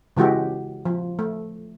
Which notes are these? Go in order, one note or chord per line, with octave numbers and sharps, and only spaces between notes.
C#3 E3 G#3 F#4 G4
F3
A3